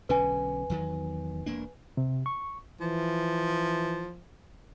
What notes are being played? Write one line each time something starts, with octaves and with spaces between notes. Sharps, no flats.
B1 D3 C#4 B4 G#5
E2 D#3 F#3
E1 A#3 D4
C3
C#6
E3 F3